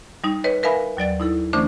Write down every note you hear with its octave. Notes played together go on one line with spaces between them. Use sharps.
G3 D#4
B4 C#5 D#5
A#4 B4 E5 F5 G#5 B5
D#2 F#3 D5 A6
D#4 E4 A4
D3 E3 A3 C#4 D4 C5